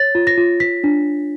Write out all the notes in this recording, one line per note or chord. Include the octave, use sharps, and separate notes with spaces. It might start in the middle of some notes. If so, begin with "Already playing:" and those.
Already playing: C#5 A6
F4
A#6
F4
F4 B6
D4